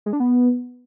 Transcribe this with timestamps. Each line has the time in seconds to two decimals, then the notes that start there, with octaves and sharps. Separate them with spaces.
0.06 G#3
0.13 D4
0.20 B3